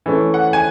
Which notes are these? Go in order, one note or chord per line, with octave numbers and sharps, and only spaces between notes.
E3 A3 C#4
F#5
G#5